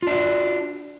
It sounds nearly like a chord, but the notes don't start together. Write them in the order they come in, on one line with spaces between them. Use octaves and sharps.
F4 D4 F#4